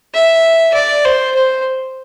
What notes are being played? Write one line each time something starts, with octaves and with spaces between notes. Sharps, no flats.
E5
D5
C5
C5